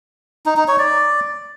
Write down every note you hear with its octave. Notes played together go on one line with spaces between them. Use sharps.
D#4
D#4
C#5
D5